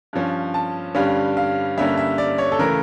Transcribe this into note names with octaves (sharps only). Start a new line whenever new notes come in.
G2 F3 C#4
A5
G2 D3 G3 C#4 F5
F5
G2 D3 G3 A#3 C#4 E5
E5
D5
C#5
A4
C#3 E3 A3 A#4